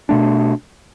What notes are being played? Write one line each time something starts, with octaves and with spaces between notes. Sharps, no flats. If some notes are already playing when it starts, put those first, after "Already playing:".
B2 A3 D4